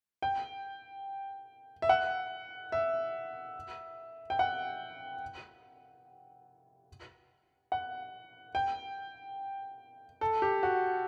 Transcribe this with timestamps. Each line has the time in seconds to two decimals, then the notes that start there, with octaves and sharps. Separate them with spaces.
0.22 G5
1.82 E5
1.89 F#5
2.72 E5
4.30 G5
4.39 F#5
7.72 F#5
8.55 G5
10.21 A4
10.42 G4
10.63 F#4